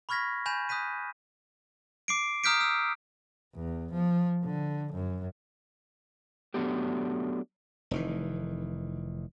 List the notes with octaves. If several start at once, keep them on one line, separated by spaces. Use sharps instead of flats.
B5 C#6 F6 G#6 A#6 B6
G#5 B5 G6 E7
D#6 F#6 G6 B6 D#7
D6 C7 D7
A#5 D#6 F6 G6 B6 D7
E6
E2
F3
D3
F#2
F#3 A3 B3 D4 G4
F1 D#3 E3